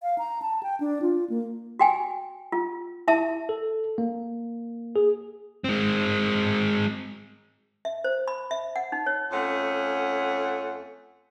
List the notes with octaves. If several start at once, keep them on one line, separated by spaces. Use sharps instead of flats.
F5
A#5
A5
G5
D4
F4
A#3
F#4 G5 G#5
F4
E4 E5 A5
A4
A#3
G#4
G#3 C4
E5
C5
B5
E5
F#5
D#4
C#5
F2 A3 C#4 F#5